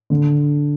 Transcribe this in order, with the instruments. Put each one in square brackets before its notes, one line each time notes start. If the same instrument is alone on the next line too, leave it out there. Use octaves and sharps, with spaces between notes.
[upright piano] D3